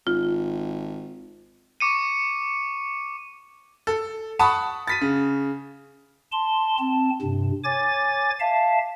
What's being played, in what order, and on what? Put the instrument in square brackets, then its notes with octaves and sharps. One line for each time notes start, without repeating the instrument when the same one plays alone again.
[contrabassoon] G#1 [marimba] F4
[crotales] C#6 D6 C#7 D#7
[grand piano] A4
F#5 A5 B5 C#6 D#6
A6 B6 D#7
C#3
[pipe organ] A5 C6
C4 A5
G2 C3
C#5 G#5 D6 A6
E5 F5 A5